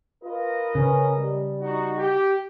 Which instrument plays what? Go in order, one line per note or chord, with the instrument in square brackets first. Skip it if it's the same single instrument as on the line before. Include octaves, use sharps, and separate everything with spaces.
[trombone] F4 [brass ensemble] A#4 B4 D#5
[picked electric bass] C#3 [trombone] C#4
[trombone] G3
[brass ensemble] D#4 F#4
G4